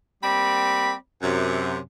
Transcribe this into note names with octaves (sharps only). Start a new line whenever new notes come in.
G3 A#3 C4 D5 B5
F#2 C3